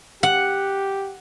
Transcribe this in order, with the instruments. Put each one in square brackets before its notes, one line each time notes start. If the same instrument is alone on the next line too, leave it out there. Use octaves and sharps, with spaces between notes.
[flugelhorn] G4 [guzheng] F#5